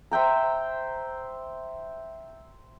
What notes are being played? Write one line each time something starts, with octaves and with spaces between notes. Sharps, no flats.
C5 E5 G5 A#5